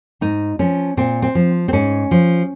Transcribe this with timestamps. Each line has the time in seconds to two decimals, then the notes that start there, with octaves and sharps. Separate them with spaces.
0.21 G#2 D#4
0.59 F3 C#4
0.97 A#2 C4
1.22 C4
1.35 F3
1.68 C4
1.73 G#2 C#4
2.11 F3